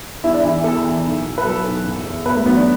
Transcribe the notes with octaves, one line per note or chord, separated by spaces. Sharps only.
E2 E4
D4
E3 E4
E2 A4
E3
B1
B2
B4
F#3 A4
B1
F#1
E2
B2 B4
A3
F#3 B3
D4